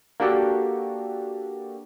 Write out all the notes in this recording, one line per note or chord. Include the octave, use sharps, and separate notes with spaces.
A#3 D4 F#4 G4 A4